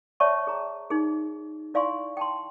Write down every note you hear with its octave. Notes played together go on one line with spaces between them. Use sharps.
C#5 D5 E5 G5 A5 C#6
G#4 A#5
D#4 G#4
E4 D5 F5 G#5 C6 C#6
G5 A5 C6